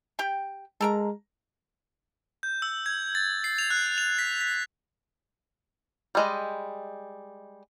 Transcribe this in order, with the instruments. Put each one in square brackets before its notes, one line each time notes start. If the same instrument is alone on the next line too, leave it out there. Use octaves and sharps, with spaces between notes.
[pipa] G4 G5
[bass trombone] G#3 [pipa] A4 A#4 A#5
[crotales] G6
E6
G#6
A6
C7
F7
F#6
F7
B6
B6
[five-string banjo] G3 G#3 D#5